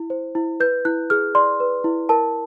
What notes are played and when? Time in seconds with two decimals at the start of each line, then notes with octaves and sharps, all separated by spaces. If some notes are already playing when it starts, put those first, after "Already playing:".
Already playing: E4
0.10 C5
0.35 E4
0.60 B4 G6
0.85 E4 F#6
1.10 G#4 F6
1.35 D5 C6
1.60 B4
1.84 E4
2.09 A#4 A5